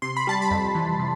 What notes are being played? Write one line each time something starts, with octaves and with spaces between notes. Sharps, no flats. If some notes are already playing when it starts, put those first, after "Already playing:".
C3 C6
B5
G3 A5
B5
F2
E3
C3